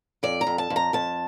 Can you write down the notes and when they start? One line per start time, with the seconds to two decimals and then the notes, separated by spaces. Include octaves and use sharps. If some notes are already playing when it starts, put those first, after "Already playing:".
0.23 F2 D5
0.41 A#5
0.47 F2
0.58 A5
0.70 F2
0.76 A#5
0.93 F2 A5